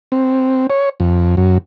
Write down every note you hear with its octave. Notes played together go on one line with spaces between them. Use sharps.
C4
C#5
F2
F#2